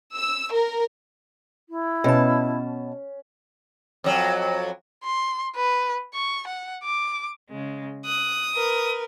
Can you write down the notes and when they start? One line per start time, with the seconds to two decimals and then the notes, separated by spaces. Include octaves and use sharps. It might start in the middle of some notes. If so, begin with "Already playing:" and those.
0.15 E6
0.55 A#4
1.69 E4
2.04 B2 C#4 A5
4.04 F2 F#3
5.03 C6
5.56 B4
6.14 C#6
6.47 F#5
6.83 D6
7.50 C#3 G#3
8.06 D#6 F#6
8.55 A#4 B4